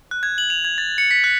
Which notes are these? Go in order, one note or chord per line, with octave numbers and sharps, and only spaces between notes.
F#6
G#6
F#7
F7
G#6
A6
C#7
B6
F#6